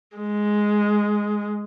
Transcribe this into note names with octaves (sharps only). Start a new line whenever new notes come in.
G#3